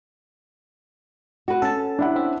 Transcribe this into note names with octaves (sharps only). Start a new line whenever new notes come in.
F#4 B4
C#4 A4 A5
D4 E4 F#5
C4 E5